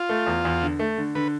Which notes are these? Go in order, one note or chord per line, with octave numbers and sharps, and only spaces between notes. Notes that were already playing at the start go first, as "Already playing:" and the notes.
Already playing: F4
A3
E2
E2
D3
A3
D3
D3 B4